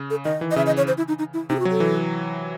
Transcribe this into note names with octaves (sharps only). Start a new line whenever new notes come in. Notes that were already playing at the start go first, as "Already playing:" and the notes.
Already playing: C#3
A4
D#3 D#5
E3
D#5
C#3 E5
D#5
C#5
C5
E4
D#4
D#4
E4
C3 D#4
G#4
F#4
F#3
A4
E3